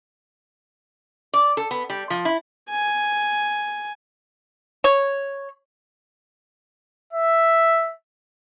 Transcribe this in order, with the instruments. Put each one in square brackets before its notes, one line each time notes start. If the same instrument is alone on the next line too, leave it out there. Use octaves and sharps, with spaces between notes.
[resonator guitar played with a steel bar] D5
A4
B3
G3
F3
E4
[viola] G#5
[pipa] C#5
[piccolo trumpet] E5